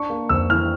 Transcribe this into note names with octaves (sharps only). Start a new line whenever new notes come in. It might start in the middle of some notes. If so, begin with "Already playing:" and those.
Already playing: D4 C#6
A#3
F2 E6
E3 F6